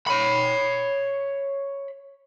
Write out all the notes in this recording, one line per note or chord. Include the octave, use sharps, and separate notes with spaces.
C#5 B5